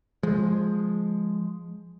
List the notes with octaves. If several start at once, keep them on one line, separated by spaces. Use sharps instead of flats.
F3 G#3